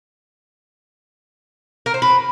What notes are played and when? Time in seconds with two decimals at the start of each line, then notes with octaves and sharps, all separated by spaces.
1.86 A#4
1.94 C5
2.02 B4